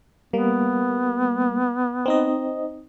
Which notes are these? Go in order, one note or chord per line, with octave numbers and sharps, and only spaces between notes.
G3 A#3 B3
C4 D#4 D#5